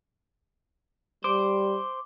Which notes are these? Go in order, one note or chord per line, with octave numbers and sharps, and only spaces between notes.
G3 C5 D6